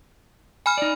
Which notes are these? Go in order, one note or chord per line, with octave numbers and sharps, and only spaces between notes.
G#5 B5 F6
D#4 D5